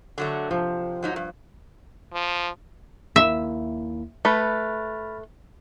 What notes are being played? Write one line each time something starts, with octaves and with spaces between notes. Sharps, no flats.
D3 F#3 A3
C3 F3
G#2 F#3 D#4
G2
F3
D#2 A#3 E4 E5
A3 B4 B5 F6 A6